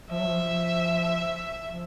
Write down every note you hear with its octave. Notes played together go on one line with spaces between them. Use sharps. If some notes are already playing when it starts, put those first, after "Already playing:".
F3 E5
F#3
F3
F3